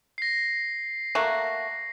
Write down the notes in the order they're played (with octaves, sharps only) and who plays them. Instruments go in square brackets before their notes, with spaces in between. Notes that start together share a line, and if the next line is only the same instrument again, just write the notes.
[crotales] A#6 C7
[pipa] A3 A#3 F#4